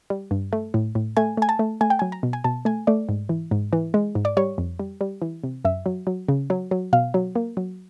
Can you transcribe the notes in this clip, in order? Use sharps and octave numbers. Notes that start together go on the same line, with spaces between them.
G3
G2
A3
A2
A2
A3 G#5
A3 G#5
A5
A3
A3 G#5
G5
F#3 G#5
A#5
B2
G#5
B2 A5
A3 G#5
A3 D5
G#2
E3
G#2
E3
G#3
G#2
D5
G3 C#5
F2
G3
G3
E3
C3
F#2 E5
F#3
F#3
C#3
F#3
F#3
B2 F5
F#3
A#3
F#3